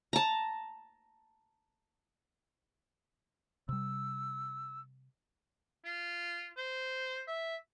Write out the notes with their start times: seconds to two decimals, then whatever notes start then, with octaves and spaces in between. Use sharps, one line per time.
0.13 A5 A#5
3.69 C3 G3 E6
5.85 F4
6.57 C5
7.28 E5